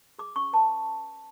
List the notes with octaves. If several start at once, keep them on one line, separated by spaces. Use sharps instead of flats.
G#4 D6
C#4 C#6
B4 A5